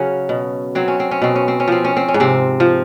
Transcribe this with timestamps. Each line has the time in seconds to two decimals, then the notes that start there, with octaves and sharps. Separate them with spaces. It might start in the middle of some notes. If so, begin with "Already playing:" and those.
Already playing: C#3 F#3 C#4
0.29 B2
0.75 F#3 C4
0.88 C#4
1.00 C4
1.11 C#4
1.22 B2 C4
1.36 C#4
1.48 C4
1.60 C#4
1.68 F3 C4
1.85 C#4
1.97 C4
2.08 C#4
2.14 G#2
2.20 C3 C4
2.60 F3